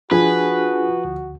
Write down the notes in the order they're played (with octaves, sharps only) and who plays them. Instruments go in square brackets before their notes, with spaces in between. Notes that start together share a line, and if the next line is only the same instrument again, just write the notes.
[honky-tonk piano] F3 [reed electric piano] D4 G#4 G#5 [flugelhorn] F#4 [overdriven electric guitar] B4
[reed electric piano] D2